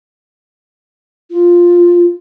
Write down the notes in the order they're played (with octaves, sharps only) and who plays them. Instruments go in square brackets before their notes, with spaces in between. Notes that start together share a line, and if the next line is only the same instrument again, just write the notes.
[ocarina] F4